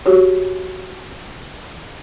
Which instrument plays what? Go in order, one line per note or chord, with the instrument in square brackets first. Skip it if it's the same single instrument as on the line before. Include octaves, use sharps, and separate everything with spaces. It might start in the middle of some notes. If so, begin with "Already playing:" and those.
[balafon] F#4 G4 C#5